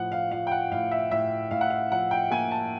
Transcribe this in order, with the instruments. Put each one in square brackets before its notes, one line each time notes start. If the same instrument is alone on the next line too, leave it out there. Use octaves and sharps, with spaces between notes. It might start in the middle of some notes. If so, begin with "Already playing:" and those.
Already playing: [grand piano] A2 F3 F#5
F5
F3 F5
G5
F#5
A2 F5
E5
A2 E5
A2 F5
F#5
F5
F3 F#5
G5
A#3 G#5
A5